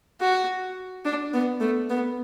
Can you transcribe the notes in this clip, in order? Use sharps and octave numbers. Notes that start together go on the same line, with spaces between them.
F#4
D4
B3
A3
B3